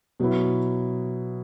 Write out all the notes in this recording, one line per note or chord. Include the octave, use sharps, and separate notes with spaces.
B2 F#3 B3 E4